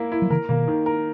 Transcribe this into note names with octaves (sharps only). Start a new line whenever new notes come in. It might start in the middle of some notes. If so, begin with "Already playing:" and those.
Already playing: A#3 E4
E4
F#3
C#3 E3 A#4
B2 D#3 A#3
D#3
A#4